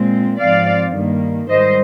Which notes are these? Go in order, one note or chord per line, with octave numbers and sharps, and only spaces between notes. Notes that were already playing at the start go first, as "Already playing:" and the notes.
Already playing: A#2 G#3 C4
G#2 F3 C4 D5 F5
G2 D#3 G3 A#3
G#2 D#3 G3 C5 D#5